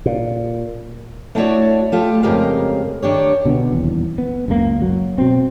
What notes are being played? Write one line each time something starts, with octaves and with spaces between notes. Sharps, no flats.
A#2
A3 D4 E4 F#4 C#5 D5
A3 F4 G4
F2 C#3 G#3 G4 A#4 F5
D#3 D4 G4 C#5
B2 D3 F3 B3
D#1 E2
B3
F#1 C#2 A#2 A#3
F#3
B2 C4